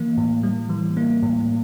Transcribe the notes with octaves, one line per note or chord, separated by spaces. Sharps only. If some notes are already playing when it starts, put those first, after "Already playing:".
Already playing: E3 A#3
A2
G3
E3
A#3
A2